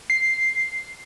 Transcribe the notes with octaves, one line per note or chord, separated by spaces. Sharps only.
C7